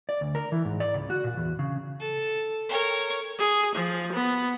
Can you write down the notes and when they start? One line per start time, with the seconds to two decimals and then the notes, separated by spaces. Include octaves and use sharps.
0.09 D5
0.21 D2
0.35 A#4
0.52 E3
0.65 G#2
0.80 D5
0.94 C#2
1.10 F#4
1.24 A#2
1.37 E2
1.59 C#3
2.00 A4
2.69 A#4 C#5
3.39 G#4
3.75 F3
4.12 B3